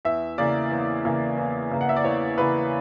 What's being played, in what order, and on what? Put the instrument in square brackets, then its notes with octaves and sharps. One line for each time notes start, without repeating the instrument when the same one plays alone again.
[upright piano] E2 E5
C#3 E3 A#3 D5
E2
C#3 E3 A#3
E2
C#3 E3 A#3
F#5
E5
D5
E2 C#5
C#3 E3 A#3 B4